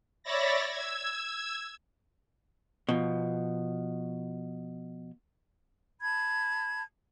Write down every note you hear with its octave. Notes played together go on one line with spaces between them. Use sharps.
C#5 D5 E5 B5 A6 A#6
E6 G#6
B2 F3
A5 B5 G#6